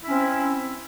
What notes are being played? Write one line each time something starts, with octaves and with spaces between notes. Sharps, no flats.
C4 C#4 E4